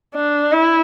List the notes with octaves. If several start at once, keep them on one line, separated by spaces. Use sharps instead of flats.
D4
E4